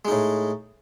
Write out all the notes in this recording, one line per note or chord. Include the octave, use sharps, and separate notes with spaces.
A2 G#3 D#4